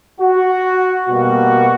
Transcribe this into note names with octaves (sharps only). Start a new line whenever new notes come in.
F#4
B2 G3 A#3 F#4